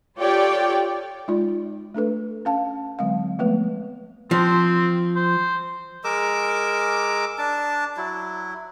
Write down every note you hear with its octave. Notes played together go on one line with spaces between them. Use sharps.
F4 G4 A4 C#5 D5 G5
G#3 D#4 F4 D5
A3 D4 A4 B4
C#4 F5 A5
D3 F#3 G#3 C4 F5
F3 G#3 A3 B3 B4
F3 C4
C5
G#3 A#4 D6 E6
D4 A5
F#3 E4